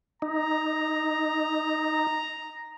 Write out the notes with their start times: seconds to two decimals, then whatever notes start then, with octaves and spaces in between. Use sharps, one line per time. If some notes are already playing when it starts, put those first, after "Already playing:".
0.22 D#4 A#5